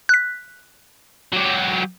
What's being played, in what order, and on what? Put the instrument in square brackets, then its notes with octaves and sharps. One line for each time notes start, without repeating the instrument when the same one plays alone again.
[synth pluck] F#6 B6
[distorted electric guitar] F#3 G4